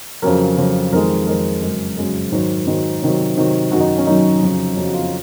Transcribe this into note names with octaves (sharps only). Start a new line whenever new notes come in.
F2 C#3 F#3 A#4
F2 C#3 F#3
F2 D#3 G#3 A#4
F2 D#3 G#3 A#4
F#2 C#3 G#3
F#2 C#3 G#3
G#2 D#3 F#3
G#2 D#3 F#3 D#4
C3 D#3 F#3
C3 D#3 F#3
F#2 D#3 F#3 F#4
D#4
C#4
F#2 D#3 F#3 D#4
F2 C#3 F#3
F2 C#3 F#3
F#4
F4
C#4